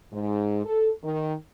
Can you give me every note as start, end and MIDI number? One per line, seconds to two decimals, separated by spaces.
0.13 0.64 44
0.65 0.90 69
1.03 1.34 51